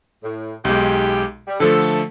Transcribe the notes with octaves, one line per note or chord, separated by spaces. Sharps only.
A2
B1 G#3 G4
G3
D3 F3 A3 A4